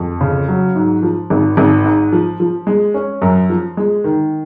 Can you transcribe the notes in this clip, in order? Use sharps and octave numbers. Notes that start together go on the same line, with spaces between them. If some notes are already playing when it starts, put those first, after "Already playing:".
Already playing: F2
C#3
F#3
G#2
F3
G#1
G#1
G#2
F3
F3
G#3
C#4
F#2
F3
G#3
D#3